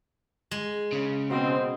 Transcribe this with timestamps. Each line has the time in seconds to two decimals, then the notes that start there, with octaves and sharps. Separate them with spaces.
0.51 G#3
0.93 C#3
1.30 B2 C4 D#5 D#6